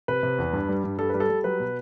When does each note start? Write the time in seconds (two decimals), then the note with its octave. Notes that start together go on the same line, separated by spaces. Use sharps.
0.08 C3 B4
0.23 C3
0.38 E2
0.53 G2
0.69 G3
0.84 G2
0.98 G3 A4
1.10 G3 B4
1.20 A4
1.29 G3
1.44 F#3 B4
1.60 B2